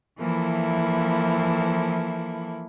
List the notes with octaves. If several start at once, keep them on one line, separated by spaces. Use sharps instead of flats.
E3 F3 A#3 E4 A4